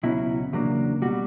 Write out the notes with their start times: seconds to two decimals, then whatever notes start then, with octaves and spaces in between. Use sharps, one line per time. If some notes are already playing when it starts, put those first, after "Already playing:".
0.03 C#2 B2 F#3 C#4 E4
0.53 E2 C#3 F#3 A#3 D4
1.02 B2 G3 F#4